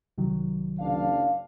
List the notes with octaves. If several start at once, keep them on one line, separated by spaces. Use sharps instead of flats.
C2 D#3 F#3
F#1 D4 F5